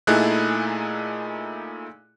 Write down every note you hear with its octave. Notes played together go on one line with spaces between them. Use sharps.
A#2 A3 D#4 E4 G#4 F#6